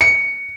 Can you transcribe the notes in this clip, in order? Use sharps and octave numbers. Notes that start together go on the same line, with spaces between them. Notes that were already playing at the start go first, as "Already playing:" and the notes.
C#7